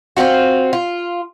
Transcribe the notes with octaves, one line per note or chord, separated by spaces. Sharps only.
C4 C#4 F4 F#4
F4